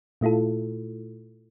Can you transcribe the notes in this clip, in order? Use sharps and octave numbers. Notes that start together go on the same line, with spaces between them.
A#2 A3 E4 F4 A4